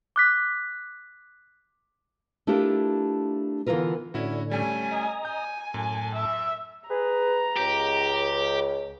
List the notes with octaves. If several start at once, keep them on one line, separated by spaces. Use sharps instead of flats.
D6 F#6 B6
A3 D4 E4 F4 G4 A#4
D3 E3 B3 F4 A#4 B4
A2 D3 C#4 E4 F#4
G3 A3 C#4 G#5
D#5 A#5
G#5 G6
F#2 A2 A5
E5
G#4 B4 A#5
C#2 G4